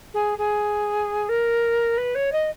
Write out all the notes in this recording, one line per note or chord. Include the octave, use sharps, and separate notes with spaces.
G#4
G#4
A#4
B4
C#5
D#5